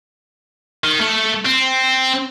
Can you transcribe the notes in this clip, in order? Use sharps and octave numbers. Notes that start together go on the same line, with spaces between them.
D#3
A3
C4